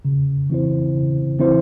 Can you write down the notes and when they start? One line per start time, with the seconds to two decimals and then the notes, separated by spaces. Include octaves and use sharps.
0.05 C#3
0.50 E3 C4 E4 C5
0.94 C#3
1.39 E3 C4 E4 C5